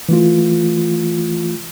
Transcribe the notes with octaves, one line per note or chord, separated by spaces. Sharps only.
E3 A3 F4